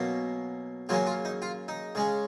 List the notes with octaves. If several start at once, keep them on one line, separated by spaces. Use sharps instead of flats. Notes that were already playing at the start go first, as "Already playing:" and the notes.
Already playing: B2 F#3 A#3 C#4
C#3 F#3 A#3 C#4 F4
F4
D#4
F4
D#4
C#3 G#3 C#4